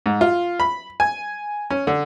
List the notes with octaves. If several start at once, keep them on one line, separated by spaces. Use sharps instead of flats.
G#2
F4
B5
G#5
C#4
D3